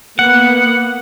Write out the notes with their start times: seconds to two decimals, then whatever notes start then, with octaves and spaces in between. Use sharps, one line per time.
0.19 A#3 B3 F#5